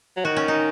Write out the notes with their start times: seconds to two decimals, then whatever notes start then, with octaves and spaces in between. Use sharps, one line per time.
0.17 F#3
0.25 D#3 F#4
0.36 C#4
0.48 D#4